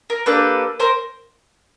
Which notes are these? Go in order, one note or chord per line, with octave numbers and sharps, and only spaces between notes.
A#4
A#3 D4 G4 A4 B4
A#4 C5